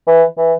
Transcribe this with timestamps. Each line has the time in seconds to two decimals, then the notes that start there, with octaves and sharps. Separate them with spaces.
0.07 E3
0.38 E3